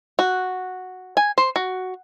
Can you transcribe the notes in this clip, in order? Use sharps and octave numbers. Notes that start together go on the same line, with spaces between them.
F#4
G#5
C5
F#4